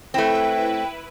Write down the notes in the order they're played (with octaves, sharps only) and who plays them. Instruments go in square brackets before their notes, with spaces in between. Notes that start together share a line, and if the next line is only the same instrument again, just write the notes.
[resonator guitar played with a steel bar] A3 C4 [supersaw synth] E4 B4 [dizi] G5